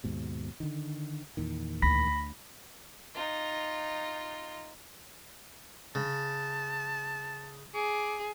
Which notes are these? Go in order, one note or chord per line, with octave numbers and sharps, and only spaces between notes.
D#2 G#2 B2
D3 D#3
E2 A#2 D#3
D2 B5 A#6 B6
D#4 F4
C#3 A5
G#4 D6